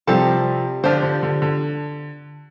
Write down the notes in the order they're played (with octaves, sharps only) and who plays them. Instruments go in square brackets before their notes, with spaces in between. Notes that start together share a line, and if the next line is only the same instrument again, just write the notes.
[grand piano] C3 F3 [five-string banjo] G3 C4 A4
[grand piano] D3 [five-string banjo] F3 D4 G4 C5
[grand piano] D3
D3
D3